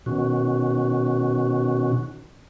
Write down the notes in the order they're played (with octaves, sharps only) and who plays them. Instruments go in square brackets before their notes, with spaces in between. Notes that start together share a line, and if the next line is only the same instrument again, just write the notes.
[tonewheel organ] B2 D#3 C#4 F#4